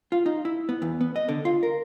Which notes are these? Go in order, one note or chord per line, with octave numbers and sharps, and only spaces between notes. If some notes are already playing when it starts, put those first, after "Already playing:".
F4
D#4
E4
B3
E2
B3
D#5
D3
F4
A#4